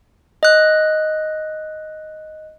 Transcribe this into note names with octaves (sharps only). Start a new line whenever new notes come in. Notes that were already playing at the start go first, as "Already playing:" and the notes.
D#5 F#6